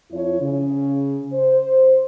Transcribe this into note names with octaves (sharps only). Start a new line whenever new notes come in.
F2 F3 E4 C#5
C#3
C5